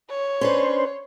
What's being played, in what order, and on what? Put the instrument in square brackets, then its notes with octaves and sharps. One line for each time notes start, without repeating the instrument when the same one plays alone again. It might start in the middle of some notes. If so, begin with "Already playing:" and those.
[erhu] C#5
[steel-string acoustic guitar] C#4 D4 B4 [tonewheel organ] C5